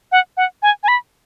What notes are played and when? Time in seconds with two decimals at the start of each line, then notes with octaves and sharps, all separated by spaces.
0.12 F#5
0.37 F#5
0.63 G#5
0.83 G#5
0.88 B5